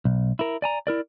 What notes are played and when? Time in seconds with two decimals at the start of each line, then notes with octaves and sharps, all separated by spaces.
0.05 B1
0.39 E4 A#4
0.62 D5 G#5 A#5
0.87 E4 A#4 D5